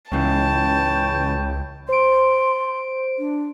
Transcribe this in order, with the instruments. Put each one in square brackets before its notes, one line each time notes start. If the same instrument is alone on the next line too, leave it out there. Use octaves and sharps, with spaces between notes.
[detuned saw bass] C#2 [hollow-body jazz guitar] G#2 C#3 E3 [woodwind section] B4 C#5 G5 [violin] A5
[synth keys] C5 D7 [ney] C6
[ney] D4